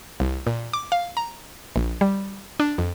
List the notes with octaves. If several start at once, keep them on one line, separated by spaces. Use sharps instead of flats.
C2
A#2
D6
F5
A#5
A#1
G3
D4
F2